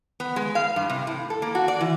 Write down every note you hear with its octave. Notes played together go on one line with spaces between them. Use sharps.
B3
G#3
F5
G2
C3
A2
A4
A#3
F#4
D5
E3